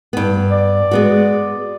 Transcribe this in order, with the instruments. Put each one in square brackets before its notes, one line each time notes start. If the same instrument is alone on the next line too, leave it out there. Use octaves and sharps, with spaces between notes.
[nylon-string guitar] G2 B3
[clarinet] D5
[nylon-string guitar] G#3 B3 F#4